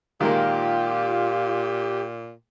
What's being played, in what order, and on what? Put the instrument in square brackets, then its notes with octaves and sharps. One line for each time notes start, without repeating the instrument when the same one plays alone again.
[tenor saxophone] A#2 [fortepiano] D#3 G#3 A#3 [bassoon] F4 [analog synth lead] G4